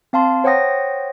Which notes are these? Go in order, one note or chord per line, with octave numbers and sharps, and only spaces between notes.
C4 F5 A5 C6
C5 C#5 F#5 G5 D#6 A#6